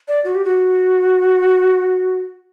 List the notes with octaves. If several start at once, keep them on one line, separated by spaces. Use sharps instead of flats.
D5
F#4
G4
F#4